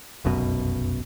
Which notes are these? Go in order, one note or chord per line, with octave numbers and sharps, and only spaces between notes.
F1 B1 F#2 B2